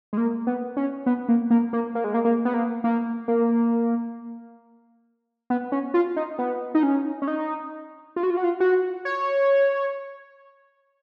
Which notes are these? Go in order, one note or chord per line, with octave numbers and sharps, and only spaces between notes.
G#3
A#3
B3
C#4
B3
A#3
A#3
A#3
A#3
G#3
A#3
A#3
B3
A#3
A#3
A#3
B3
C#4
F4
D#4
B3
D#4
C#4
C#4
D#4
F4
F#4
F4
F#4
F4
F#4
C#5